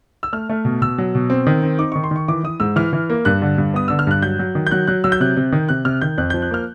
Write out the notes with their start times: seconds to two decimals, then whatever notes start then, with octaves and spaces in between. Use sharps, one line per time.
0.23 E6
0.33 A3 F6
0.49 A3
0.65 B2
0.81 B2 E6
0.98 F#3
1.15 B2
1.30 C4
1.47 D#3
1.63 C4
1.79 D#4 D6
1.92 D#3 C#6
2.04 C6
2.11 D#3 C#6
2.28 E3 D6
2.44 E3 D#6
2.60 G#2 E6
2.76 E3 F6
2.93 E3
3.10 A#3
3.25 G2 F#6
3.42 D3
3.58 G2
3.74 B3 D#6
3.88 D3 E6
3.99 F6
4.07 G2 F#6
4.22 F#3 G6
4.39 F#3
4.55 D#3
4.67 G6
4.71 F#3 F#6
4.87 F#3 F#6
5.04 F#3 E6
5.12 G6
5.20 C3 F#6
5.37 C3
5.52 D#3
5.69 C3 F#6
5.85 C3 F6
6.02 D#3 G6
6.18 F2 F#6
6.30 F3 G6
6.42 F#6
6.51 A#3 F6